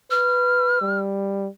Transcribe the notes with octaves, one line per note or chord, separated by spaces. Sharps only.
B4 F6
G3